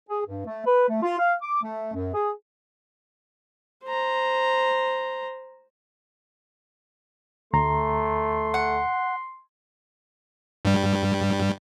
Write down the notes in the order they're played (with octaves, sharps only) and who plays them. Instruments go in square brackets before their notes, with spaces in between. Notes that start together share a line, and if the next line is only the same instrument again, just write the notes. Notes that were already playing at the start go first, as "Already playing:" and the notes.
[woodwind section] G#4
G2
A3
B4
A3
F4
F5
D6
A3
F#2
G#4
[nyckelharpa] C5 A#5
[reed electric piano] D2 A#5 [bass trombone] A3 [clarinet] C6
[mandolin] F#5
[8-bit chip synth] G2 G3